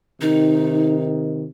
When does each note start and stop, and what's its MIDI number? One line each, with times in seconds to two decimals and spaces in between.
0.21 1.45 48
0.21 1.45 51
0.21 1.05 63